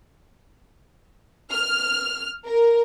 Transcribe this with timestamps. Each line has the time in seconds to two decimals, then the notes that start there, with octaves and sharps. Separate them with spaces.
1.51 F6
2.45 A#4